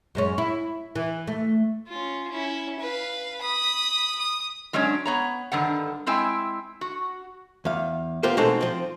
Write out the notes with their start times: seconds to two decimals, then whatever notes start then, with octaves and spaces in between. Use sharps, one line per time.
0.15 F#2 G#3 C#4
0.38 E4
0.95 E3
1.27 A3
1.88 C#4 F4
2.31 C#4 E4
2.80 B4 F5
3.42 B5 D#6
4.19 D#6
4.73 F#3 G#3 C#4 D4 C#5
5.06 B3 C#5 A#5
5.52 G2 D3 D#3 F#5
6.07 G#3 C4 E4 G5 G#5
6.81 F#4
7.65 E2 F5
8.23 B3 F4 G4 A#4 C5
8.37 B2 G#3 C4 D#4 A4
8.61 F3 C4